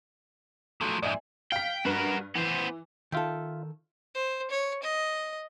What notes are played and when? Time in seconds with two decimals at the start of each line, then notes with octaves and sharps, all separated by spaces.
0.81 F3 F#3 A3
1.03 F2 G#2 D5 E5 G#5
1.52 F5 G5 B6
1.85 G2 F#4 A#4 B4
2.35 E3 B3 C5
3.12 D#3 F4 A4 E5 G5
4.15 C5
4.50 C#5
4.83 D#5